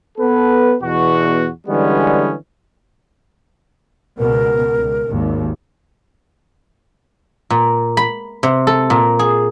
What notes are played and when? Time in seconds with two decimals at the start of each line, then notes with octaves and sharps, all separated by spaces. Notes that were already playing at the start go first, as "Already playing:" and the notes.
0.18 B3 A4 B4
0.82 E2 B2 F#4
1.67 D3 E3 G3 G#3 B3 C#4
4.18 C#2 B2 A#4
4.77 C#2
5.11 G#1 D#2
7.50 A#2
7.97 B5
8.43 C3
8.67 A4
8.90 A#2
9.19 G#4